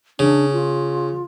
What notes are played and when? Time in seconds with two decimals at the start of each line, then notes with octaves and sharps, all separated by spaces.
0.19 C#3 D4
0.53 F4